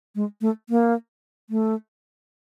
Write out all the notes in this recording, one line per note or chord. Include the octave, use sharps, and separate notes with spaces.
G#3
A3
A#3
A3